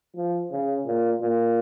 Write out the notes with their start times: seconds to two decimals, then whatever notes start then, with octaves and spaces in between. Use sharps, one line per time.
0.16 F3
0.51 C#3
0.86 A#2
1.21 A#2